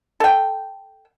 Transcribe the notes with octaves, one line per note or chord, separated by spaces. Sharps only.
A4 G5